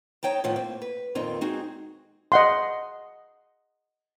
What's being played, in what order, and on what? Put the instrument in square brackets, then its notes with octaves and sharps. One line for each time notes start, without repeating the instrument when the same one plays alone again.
[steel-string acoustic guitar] D#4 C#5 G5 A5 A#5
A2 D#3 F3 A3 B3
A#3 C4
B4
F2 A#2 D#3 C4 A#5
G#3 C4 D#4 F#4 G#4
[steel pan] D#5 F#5 C6